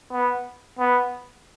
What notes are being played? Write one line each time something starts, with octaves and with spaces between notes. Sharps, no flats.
B3
B3